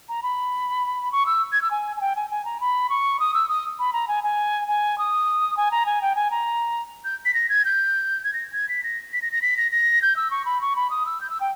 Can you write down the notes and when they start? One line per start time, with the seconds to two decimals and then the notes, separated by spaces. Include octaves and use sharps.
0.09 A#5
0.23 B5
1.12 C#6
1.26 E6
1.52 G#6
1.62 E6
1.71 G#5
1.97 G#5
2.01 G5
2.16 G#5
2.31 G#5
2.45 A#5
2.60 B5
2.90 C#6
3.20 D#6
3.34 E6
3.49 D#6
3.79 B5
3.93 A#5
4.08 G#5
4.24 G#5
4.68 G#5
4.98 D#6
5.57 G#5
5.71 A#5
5.86 G#5
6.02 G5
6.16 G#5
6.31 A#5
7.05 G6
7.25 B6
7.34 A#6
7.49 G#6
7.65 G6
8.24 G#6
8.34 A#6
8.53 G#6
8.69 B6
8.84 A#6
9.13 B6
9.22 A#6
9.32 A#6
9.42 B6
9.57 A#6
9.71 A#6
10.02 G6
10.16 E6
10.31 C#6
10.45 B5
10.61 C#6
10.76 B5
10.90 D#6
11.06 E6
11.21 G6
11.30 E6
11.40 G5